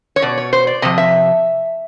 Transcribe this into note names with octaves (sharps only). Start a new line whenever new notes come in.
C#5
B2 D5
C#5
C5
D5
C3 F3 D#5
E5